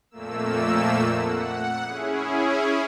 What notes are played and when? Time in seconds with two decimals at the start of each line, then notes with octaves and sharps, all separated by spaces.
0.10 F2 A#2 A3 A#3 E6
1.17 F#5
1.82 C#4 E4 G#4